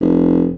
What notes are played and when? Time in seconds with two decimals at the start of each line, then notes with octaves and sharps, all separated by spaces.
0.01 F1